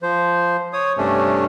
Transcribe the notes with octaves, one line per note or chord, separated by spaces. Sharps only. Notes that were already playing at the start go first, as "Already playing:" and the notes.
F3 C5
C#5 D#6
G2 C3 A3 C#4 D4